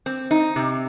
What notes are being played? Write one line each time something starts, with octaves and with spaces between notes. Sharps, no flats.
C4
D#4
C3